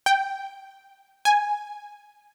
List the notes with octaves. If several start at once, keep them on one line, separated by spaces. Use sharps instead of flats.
G5
G#5